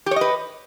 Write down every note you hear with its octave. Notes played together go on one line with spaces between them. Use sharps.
G4 B4 C#5 D#5